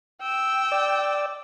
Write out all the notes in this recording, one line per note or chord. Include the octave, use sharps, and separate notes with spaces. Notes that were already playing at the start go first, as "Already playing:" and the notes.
G5 E6
D5